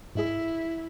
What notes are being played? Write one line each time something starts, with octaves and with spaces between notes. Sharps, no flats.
G#2 G#3 E4 G#4